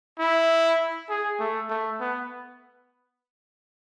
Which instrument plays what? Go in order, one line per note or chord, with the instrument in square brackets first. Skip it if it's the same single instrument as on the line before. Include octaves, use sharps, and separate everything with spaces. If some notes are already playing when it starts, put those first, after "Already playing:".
[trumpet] E4
G#4
A3
A3
B3